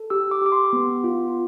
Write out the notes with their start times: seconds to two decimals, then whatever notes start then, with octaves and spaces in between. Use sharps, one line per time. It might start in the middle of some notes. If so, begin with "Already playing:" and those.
Already playing: A4
0.10 G4 E6
0.31 D6
0.42 G4 D6
0.52 C6
0.73 B3
1.04 F4